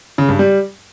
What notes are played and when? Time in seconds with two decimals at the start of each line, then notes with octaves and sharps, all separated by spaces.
0.18 C#3
0.29 G2
0.39 G3